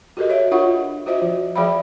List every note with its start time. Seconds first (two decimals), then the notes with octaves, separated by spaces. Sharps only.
0.17 F#4 G4 A4 A#4 D#5
0.30 C#5 E5
0.51 D4 F4 A#4 C#5 F#5 C#6
1.06 F4 F#4 C5 D#5 E5
1.22 F3
1.56 F3 G#4 E5 F5 G5 B5